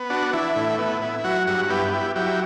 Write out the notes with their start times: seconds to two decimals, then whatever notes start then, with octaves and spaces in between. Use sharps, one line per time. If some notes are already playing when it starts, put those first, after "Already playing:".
Already playing: B3
0.10 D4 F#4
0.33 E3 E4
0.56 A2
0.79 B3
1.01 E4
1.24 F#3 F#4
1.47 G2 F#4
1.70 B3 E4 G4
1.93 E4
2.16 F#3 E4 G4